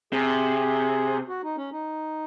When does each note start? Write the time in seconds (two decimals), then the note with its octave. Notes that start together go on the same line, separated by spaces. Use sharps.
0.13 C3 G#4
1.28 F#4
1.43 D#4
1.57 C#4
1.72 D#4